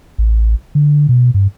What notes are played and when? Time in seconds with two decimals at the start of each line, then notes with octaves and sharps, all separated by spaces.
0.18 A1
0.75 D3
1.09 B2
1.34 G2